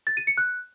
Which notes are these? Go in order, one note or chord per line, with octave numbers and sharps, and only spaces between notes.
A6
D#7
C#7
F#6